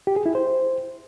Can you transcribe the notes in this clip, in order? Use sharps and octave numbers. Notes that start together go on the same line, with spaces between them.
G4
G#4
E4
C5